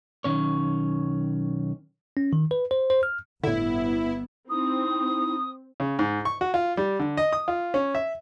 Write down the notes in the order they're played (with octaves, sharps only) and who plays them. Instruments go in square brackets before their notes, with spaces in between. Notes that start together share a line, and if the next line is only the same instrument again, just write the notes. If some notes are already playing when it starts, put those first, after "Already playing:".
[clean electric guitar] B1 G#2 D#3 C#4 C#5
[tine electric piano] C#4
D#3
B4
C5
C5
F6
[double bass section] G1 B3 [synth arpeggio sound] A2 D3 [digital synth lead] E4
[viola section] C4 [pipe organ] D#4 E4 [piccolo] D#6
[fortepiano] C#3
G#2
C#6
F#4
F4
G3
D3
D#5
D#6
F4
C#4
E5